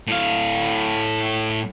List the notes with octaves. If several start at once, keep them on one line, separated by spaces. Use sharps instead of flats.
A2 F5